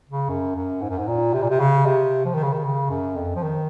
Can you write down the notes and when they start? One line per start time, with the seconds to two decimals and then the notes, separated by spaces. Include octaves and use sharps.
0.10 C#3
0.29 F#2
0.56 F#2
0.82 G#2
0.90 F#2
0.98 G#2
1.08 A#2
1.33 C3
1.42 A#2
1.50 C3
1.60 C#3
1.86 C3
2.25 F3
2.34 D#3
2.43 C#3
2.53 D#3
2.64 C#3
2.90 F#2
3.16 F2
3.36 F3
3.43 D#3